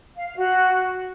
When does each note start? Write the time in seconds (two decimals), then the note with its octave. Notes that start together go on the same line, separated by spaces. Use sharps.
0.15 F5
0.26 F5
0.37 F#4